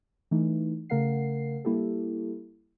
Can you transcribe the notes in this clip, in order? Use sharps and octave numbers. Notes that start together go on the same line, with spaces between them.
E3 A3 D#4
C#3 A3 A#4 F5 F#5 C7
G3 A#3 E4 G4 A4